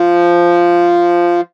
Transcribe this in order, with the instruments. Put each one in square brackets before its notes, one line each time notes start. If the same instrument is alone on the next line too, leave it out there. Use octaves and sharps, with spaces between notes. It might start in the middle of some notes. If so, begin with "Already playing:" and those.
Already playing: [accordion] F3